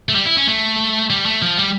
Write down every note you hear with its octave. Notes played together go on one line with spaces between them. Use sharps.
A3
G3
E4
C#4
A3
G3
A3
F3
G3